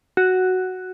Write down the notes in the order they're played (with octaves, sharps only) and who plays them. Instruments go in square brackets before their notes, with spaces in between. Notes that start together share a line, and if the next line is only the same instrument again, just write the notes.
[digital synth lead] F#4